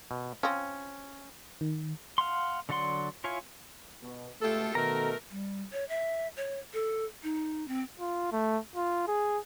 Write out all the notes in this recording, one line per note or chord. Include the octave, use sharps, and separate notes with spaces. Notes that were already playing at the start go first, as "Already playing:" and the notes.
B2
F3 C4 C#4
D#3
F5 F#5 C6
D3 F#3 D5 F#5 C6
E4 F4 C#5 F5 G#5
B2
C#2 B2 A3 F4 G4 A4
B2 D#3 A3 A4 A#4 A#5
G3
C#5
E5
C#5
A4
D#4
C4
F4
A3
F4
G#4